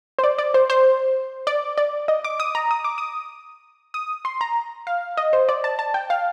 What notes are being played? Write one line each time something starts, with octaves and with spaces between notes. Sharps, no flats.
C5
D5
D5
C5
C5
D5
D5
D#5
D6
D#6
A#5
D#6
D6
D#6
D#6
C6
A#5
F5
D#5
C5
D5
A5
A5
G5
F5